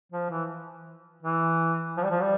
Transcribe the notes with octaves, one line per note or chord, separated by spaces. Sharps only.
F3
E3
E3
F3
G3
F3
G3